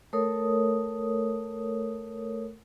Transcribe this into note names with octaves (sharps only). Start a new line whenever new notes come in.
A3 A4 A#4 C#5 D#6